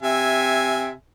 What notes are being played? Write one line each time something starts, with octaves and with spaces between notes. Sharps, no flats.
C3 E5 G#5